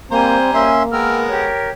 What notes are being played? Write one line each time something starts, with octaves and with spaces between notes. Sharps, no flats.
G3 A#3 C4 C5 G#5 A#5
A#3 C#4 E5 C6
G#3 B3 A#4 G5 E6 F6
G4 C#5